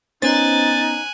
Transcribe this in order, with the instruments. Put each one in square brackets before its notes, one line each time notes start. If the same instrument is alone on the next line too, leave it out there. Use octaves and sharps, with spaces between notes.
[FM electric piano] B3 C#4 C5 [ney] D#4 [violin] G#5 F#6 [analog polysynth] A6